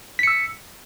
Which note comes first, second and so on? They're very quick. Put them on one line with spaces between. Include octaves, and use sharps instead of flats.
B6 C#7 E6